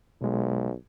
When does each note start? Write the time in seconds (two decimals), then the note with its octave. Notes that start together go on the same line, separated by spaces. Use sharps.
0.21 B1 B2 G#3